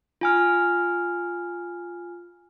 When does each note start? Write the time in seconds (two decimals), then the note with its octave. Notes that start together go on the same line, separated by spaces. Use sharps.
0.21 F4 G#5 F6